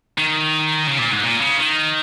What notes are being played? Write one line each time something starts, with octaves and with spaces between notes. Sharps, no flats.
D#3
C#3
A#2
G#2
A#2
C#3
D#3